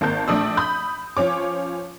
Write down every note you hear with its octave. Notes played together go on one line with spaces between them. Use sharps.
G#1 A#3 A#4 A5 G6
A#1 A3 D4 D#6 E6
B5 D#6 G6
F3 C#4 C#5 D6